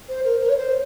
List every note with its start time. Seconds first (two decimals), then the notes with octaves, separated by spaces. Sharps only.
0.08 C5
0.24 A#4
0.40 A#4
0.48 C#5
0.56 C5